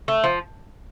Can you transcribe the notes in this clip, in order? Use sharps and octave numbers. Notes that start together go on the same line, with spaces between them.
A3
F3